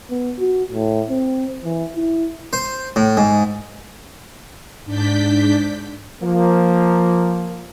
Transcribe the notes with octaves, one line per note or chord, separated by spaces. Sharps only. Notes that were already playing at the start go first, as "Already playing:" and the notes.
B3
F#4
A2
C4
E3
E4
C5
A2
G#2
G#2 D4 D5 G6 B6
F3 A#3